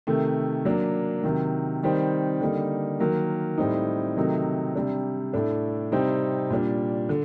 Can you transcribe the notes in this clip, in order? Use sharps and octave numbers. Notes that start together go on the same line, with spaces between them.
C3 D#3 A3
F#3 A#3 D4
C3 D#3 F#3
D#3 G3 C4 D#4
D3 G3 A#3 D#4
D#3 F#3 A#3
A2 G3 C4 D#4
C3 D#3 F#3 A3 D#4
C3 G3 D4
A2 A3 D4
C3 G3 C4 D#4
A#2 G3 D4
D3